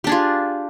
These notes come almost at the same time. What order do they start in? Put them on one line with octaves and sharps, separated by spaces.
G4 D4 G#4 F4